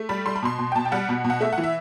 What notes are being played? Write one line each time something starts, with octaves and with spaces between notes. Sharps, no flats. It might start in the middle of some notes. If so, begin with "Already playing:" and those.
Already playing: A3
G3 B5
G3 C6
B5
B2 C6
B2
G5
B2 A5
G5
G3 F#5
B2
B2
F#5
A3 E5
F#5
E3
E5